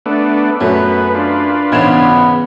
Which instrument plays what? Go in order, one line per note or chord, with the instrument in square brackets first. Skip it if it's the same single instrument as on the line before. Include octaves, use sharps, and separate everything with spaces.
[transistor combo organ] A3 B3 D4
[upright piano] F#2 A3 [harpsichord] F#3 [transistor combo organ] B3 B4
[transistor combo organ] D4 F4 B4
[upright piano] B1 G#6 E7 [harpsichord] G#2 C#3 E3 [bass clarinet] B3